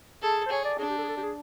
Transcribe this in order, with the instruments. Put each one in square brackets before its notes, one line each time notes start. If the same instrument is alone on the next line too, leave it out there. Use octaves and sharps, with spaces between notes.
[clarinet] G#4 [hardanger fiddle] A4
[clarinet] C5
[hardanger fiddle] G#4 [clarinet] C#5
[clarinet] D5
[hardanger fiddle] D4 [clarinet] G#4
[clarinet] G4
A4
G#4
A4
G4
G#4